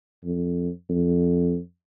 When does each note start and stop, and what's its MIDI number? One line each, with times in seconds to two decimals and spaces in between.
0.24 0.69 41
0.90 1.58 41